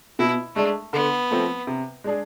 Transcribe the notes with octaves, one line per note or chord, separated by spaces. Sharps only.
B2 E4
G#3 A3 D4
D3 B3
F3 A3 C4
C3
G#3 D4 G#4